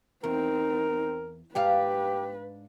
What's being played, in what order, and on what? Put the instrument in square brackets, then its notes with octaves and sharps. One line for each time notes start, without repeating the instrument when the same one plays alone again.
[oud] E2 [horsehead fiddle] C4 D#4 [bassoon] A#4
[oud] G#2 D4 F5 [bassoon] G4 [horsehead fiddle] B4